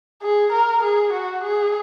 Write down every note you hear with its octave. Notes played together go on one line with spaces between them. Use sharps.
G#4
A#4
G#4
F#4
G#4